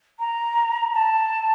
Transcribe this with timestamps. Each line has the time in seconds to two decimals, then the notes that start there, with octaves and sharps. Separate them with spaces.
0.19 A#5
0.94 A5